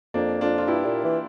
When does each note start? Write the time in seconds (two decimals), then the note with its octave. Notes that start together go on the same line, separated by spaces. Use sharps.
0.14 F2 A#3 D4
0.41 F2 D4 F4
0.58 F4
0.67 G2 E4 G4
0.85 A#2
1.04 E3